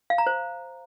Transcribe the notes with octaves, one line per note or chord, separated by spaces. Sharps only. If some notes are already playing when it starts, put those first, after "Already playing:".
F5
A#5
C5